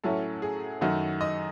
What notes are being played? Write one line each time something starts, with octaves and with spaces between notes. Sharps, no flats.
A2 F#3 C#4 E4 A4
G#4
F#2 D#3 A3 D#4 F#4
D#5